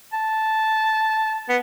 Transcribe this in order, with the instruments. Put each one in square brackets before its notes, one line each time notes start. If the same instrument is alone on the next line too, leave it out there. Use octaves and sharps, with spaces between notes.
[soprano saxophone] A5
B3